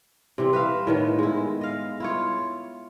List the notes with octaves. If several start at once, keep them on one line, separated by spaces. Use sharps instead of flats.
C3 E3 C4
B4 E5 F5
A2 D#3 B3
G#3 E4
D#5 F5
E4 F4 C#5